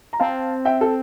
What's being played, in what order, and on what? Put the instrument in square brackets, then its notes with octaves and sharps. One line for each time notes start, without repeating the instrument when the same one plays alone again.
[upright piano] A#5
[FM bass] C4 [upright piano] F5 A5
[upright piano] E5 G5
A4